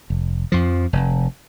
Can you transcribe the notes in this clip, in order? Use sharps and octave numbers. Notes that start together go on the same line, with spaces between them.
F1
F2 F3
F1